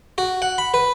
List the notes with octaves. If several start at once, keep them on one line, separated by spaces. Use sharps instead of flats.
F#4
F#5
B5
B4